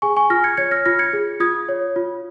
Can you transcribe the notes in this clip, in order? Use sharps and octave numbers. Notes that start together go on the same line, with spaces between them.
G#4 G#5 C#6
G#5 C#6
F4 F6 A#6
G#6 C#7
C#5 G#6 C#7
F6 A#6
F4 F6 A#6
G#6 C#7
G#4
F4 D#6 G#6
C#5
F4